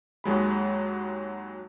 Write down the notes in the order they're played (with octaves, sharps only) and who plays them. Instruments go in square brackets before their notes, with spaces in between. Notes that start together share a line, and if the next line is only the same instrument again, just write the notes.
[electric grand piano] D#2 F#3 G#3 B5